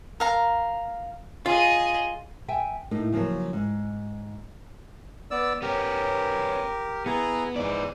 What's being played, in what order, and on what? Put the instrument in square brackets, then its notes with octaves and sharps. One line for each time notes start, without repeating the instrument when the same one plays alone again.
[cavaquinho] A#4 F5 A#5
[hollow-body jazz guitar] F4 [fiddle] G#4 D#5
[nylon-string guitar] E5 G5 G#5
A2 A#3 D#4
C#3 F3 F#3 A#3
G#2
[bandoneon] B3 D5 E6
[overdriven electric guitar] B3 C#4 [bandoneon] G4 A#4
[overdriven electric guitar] B3 [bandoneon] E4 G#4 A#5
[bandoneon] G#2 E3 [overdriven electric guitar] G#4 D5